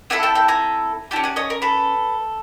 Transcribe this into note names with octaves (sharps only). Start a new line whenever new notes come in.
C4 E4 A4 F#5 G#5
G5 A5
G5 A5
G#5 A#5
C#4 E4 G4 G5 A5
F#5 G#5
C#5 D#5
A#4
A4 B4